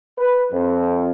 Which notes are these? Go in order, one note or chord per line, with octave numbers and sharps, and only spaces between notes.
B4
F2